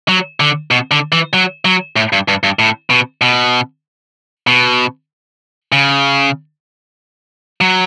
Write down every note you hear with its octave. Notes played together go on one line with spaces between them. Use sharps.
F#3
D3
B2
D3
E3
F#3
F#3
A2
G2
G2
G2
A2
B2
B2
B2
C#3
F#3